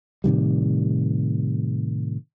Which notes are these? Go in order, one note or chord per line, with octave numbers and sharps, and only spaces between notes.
A2 C3 D#3 G3